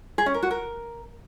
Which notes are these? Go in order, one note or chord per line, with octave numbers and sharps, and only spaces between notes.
G#4
C#4
A#4
F#4
A#4